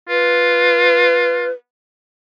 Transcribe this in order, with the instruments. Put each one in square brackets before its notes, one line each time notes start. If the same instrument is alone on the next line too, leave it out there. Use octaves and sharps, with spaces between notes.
[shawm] F4 [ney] B4